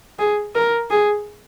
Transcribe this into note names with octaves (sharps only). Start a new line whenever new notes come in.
G#4
A#4
G#4